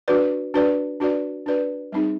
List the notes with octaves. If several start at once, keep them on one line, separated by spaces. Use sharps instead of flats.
D4 F#4 B4 D5
D4 F#4 B4 D5
D4 F#4 B4 D5
D4 F#4 B4 D5
G3 C4 D#4 G#4